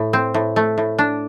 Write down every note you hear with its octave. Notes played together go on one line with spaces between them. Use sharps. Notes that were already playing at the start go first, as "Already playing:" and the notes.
Already playing: A2
C4
A2
A3
A2
D4